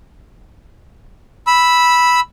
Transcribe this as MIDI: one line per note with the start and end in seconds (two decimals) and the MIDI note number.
1.47 2.20 83
1.47 2.20 88